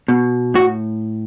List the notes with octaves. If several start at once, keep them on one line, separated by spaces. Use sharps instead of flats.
B2
A2 F#4